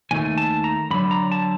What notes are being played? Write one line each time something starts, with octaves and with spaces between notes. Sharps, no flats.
D#2 D#3 A3 G#5
A5
A#5
F#2 D3 F#3 B5
A#5
A5